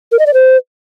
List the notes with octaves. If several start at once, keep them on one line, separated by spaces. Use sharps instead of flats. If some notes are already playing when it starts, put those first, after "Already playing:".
A#4
D#5
D5
C5